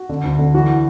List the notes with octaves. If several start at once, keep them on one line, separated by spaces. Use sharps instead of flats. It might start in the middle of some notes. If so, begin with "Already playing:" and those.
Already playing: F#4
D3
D2
D3
E3 F#4